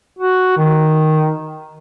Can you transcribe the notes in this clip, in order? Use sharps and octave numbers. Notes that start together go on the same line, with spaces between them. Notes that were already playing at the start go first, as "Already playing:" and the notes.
F#4
D#3